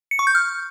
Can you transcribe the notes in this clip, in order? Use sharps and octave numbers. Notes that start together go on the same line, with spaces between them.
C#7
C#6
G6
F6